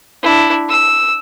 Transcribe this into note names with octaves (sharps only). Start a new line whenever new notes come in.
D4 E4
E6